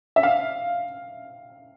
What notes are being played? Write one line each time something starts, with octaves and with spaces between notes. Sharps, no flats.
E5
F5